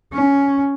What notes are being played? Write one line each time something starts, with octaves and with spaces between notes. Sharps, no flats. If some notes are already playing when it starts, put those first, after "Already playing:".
C#4